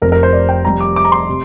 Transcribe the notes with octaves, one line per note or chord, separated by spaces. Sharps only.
F1 F2 C3 A#4
A#4
C5
D5
G5
F1 F2 C3 G3 A#5
D6
D6
A#5
C6
C3